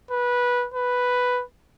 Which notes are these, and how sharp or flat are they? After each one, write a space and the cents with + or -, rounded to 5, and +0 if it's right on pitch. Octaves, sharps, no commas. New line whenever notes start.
B4 -15
B4 +0